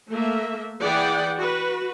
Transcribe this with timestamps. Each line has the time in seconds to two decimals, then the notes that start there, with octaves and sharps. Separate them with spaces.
0.11 A3 A#3 E5
0.82 E3 G#4 D5 F#5 G5
1.37 F#4 B4